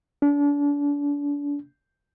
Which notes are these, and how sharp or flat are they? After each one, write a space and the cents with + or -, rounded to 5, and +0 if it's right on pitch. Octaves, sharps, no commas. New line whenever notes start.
D4 -35